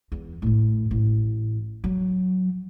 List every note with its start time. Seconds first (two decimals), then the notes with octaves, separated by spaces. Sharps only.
0.12 E2
0.42 A1 A2
0.91 A1
1.84 F#3